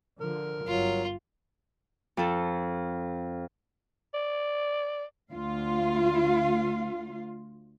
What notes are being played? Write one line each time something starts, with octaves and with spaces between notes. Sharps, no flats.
D3 F3 A#4
G1 F#3 F4
F2 A4
D5
D2 F4 F5